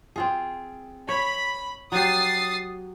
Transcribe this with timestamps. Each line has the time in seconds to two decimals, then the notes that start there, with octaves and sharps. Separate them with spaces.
0.16 C4 F4 G#4
1.09 C#5 B5
1.92 F#3 G4 D#6 A6 C7